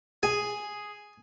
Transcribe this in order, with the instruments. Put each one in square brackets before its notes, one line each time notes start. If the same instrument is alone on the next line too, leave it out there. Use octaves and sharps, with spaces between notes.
[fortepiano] G#4 [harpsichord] G#5